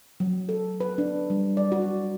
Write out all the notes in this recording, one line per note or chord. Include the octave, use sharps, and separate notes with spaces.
F#3
A4
B4
D4
G3
D5
F#4